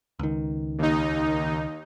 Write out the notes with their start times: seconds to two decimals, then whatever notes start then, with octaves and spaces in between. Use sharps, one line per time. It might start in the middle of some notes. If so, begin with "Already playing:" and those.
0.19 C#2 D#3
0.78 D#2 D#4